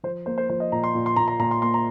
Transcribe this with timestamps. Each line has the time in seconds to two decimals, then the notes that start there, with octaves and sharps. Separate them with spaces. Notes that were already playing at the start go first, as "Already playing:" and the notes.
0.03 F3 C5
0.26 A#3 C5
0.38 C5
0.49 F3 C5
0.60 D#5
0.72 A#2 A#5
0.84 C6
0.94 A#2
1.06 C6
1.16 A#2 A#5
1.28 A#5
1.39 A#2 A#5
1.51 C6
1.62 A#3 C6
1.74 A#5